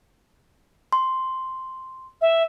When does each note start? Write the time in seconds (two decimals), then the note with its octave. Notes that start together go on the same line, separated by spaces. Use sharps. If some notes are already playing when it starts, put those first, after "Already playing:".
0.93 C6
2.21 E5